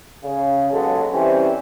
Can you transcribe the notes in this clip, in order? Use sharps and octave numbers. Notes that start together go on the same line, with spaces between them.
C#3
D#2 C#3 F#3 G#3 B3 A4
C3 E3 G3 C4 C#4